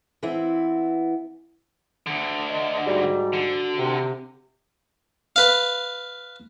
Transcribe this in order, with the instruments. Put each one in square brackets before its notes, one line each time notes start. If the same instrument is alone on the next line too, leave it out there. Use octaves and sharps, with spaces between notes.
[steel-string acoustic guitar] E3 B3 C4 E4
[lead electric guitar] D2 D3
[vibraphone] D#5
[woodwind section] G#2 G3 [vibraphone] F#4
[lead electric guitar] D3
[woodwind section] C3
[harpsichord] B4 F5